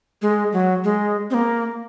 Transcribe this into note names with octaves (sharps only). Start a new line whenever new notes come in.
G#3
F#3
G#3
C4
A#3